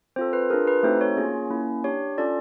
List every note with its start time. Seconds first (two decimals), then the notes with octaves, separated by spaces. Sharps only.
0.16 C4 F4 A4 C5
0.33 B4
0.50 D4 F4 G#4 A#4
0.67 B4
0.83 A3 C4 D#4 F#4 A4 C5
1.01 C#5
1.17 A#3 C#4 F4 G#4
1.50 A#3 C#4 E4
1.84 D4 G4 C#5
2.18 C#4 F4 A4 D5